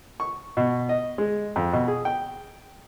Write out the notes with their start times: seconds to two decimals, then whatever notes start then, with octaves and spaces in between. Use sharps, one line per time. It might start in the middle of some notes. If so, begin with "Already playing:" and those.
0.20 C#6
0.57 B2
0.89 D#5
1.18 G#3
1.56 F2
1.73 B2
1.88 G#4
2.05 G5